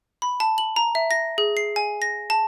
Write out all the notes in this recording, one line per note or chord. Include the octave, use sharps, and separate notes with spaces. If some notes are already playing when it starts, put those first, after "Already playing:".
B5
A5
F#7
A#5
E5
A#6
G#4
C7
G#5
A#6
A5